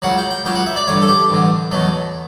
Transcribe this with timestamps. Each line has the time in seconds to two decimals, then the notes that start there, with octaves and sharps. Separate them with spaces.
0.02 C#2 C#3 F#3 F#5
0.17 G5
0.30 G5
0.45 C#2 C#3 F#3 G5
0.55 F#5
0.66 E5
0.76 D5
0.87 A1 G2 D3 C#5
1.02 A4
1.08 G4
1.30 A1 G2 D3
1.71 E2 B2 F#3 A3